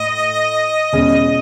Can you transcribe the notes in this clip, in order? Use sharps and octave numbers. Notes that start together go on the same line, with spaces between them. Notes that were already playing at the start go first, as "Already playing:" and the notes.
Already playing: A2 D#5
E2 B2 G#3 C#4